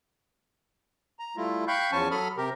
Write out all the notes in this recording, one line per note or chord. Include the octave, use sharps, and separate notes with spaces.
A#5
G3 A3 E4 F4
F5 G5 B5 C#6 F#6 G6
E2 F3 C#4 G#5 A5 C#6
F#3 A4 B5 D#6 F6
C3 G4 A#4